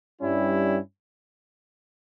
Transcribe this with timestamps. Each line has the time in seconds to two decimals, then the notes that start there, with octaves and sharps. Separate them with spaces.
0.20 G2 G3 C#4 E4